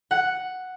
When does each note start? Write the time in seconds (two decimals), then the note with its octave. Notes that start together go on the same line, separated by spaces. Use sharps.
0.11 F#5